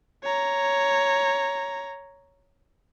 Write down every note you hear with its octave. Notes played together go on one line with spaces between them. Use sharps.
C#5 A#5